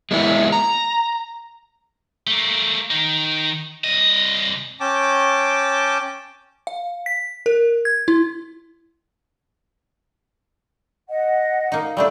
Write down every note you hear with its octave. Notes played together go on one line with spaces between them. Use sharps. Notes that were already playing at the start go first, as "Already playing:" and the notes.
G#3 A#3 B3 E4
A#5
A3 A#3
D#3 D#4
C2 D#5
C#4 G5 A5 D6
F5
B6
A#4
G#6
E4
D#5 F#5
A#3 D#4
G3 A3 D4 F5 E6